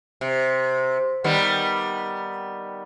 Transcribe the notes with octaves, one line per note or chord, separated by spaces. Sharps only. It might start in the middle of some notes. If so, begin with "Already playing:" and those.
C3
D#3 G3 B3